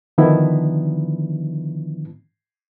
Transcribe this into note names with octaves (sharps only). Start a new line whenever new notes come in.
D3 D#3 F3 B3 D4 E4